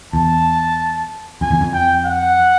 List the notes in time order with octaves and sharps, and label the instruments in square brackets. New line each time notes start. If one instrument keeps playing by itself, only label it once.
[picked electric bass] E2 [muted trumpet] A5
[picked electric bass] F2 [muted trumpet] G#5
[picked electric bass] E2
F2
[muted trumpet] G5
F#5